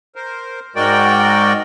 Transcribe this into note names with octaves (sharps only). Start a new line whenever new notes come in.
A#4 C5
G#2 G#3 F#4 A#4 D5 G5